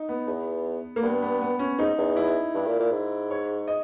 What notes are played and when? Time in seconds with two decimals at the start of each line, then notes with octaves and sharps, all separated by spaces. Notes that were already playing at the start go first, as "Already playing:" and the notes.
Already playing: D#4
0.09 B3
0.27 E2
0.96 A#3
1.02 G2 B3
1.23 B3
1.41 B3
1.59 C#4
1.79 G#2 D#4
1.98 E2
2.16 E4
2.54 G2
2.67 A#2
2.80 A#2
2.92 G#2
3.30 C#5
3.67 D#5